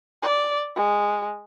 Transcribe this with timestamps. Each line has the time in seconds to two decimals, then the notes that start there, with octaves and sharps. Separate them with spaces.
0.23 D5
0.75 G#3